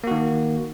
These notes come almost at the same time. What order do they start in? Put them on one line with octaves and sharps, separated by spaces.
A#3 F#4 D#3